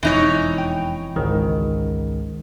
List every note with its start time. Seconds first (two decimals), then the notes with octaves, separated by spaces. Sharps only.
0.03 E1 F2 E3 D#4 C#5
0.58 G5
1.16 G#1 C#2 G#2 D#3